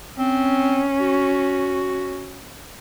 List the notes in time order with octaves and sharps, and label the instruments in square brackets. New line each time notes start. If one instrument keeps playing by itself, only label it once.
[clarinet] C4 [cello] C#4
[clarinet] F#4